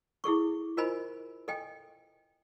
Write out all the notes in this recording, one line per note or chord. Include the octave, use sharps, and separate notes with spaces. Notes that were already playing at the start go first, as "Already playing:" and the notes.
E4 G#4 A4 C#6
F4 A#4 C5 D#5 G#5 B5
A4 D#5 G5 G#5